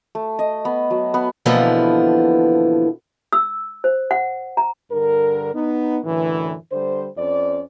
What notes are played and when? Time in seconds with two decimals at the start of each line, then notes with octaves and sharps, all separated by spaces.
0.15 A3
0.39 D#5
0.65 B3
0.90 F#3
1.14 B3
1.46 B2 D3 E3 F3 A#3 B3
3.33 E6
3.84 C5
4.11 F#5
4.57 A#5
4.91 G2 D3 A#4
5.55 B3 D#4
6.04 F#2 A2 D3 E3
6.72 D3 G3 C5
7.17 F2 C#4 C5 D5